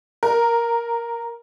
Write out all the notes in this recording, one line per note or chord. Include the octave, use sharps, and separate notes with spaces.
A#4